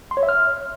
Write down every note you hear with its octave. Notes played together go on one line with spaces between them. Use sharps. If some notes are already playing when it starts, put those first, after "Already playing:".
C6
C#5
E5
F6